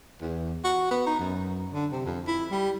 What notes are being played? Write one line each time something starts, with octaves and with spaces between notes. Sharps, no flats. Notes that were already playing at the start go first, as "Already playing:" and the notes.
E2
F#4
B3
D#4
F#2
D3
C3
F2
E4
G3